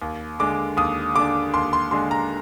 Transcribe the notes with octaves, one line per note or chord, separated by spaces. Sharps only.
D#2
D3 G#3 D4 D6
D#2 D#6
D3 G#3 D4 D6
D#2 C6
C6
D3 G#3 D4 C6
A#5